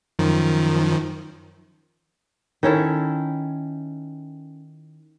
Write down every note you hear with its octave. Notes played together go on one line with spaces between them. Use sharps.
F#2 D#3 F3
D#3 C#4 E4 A4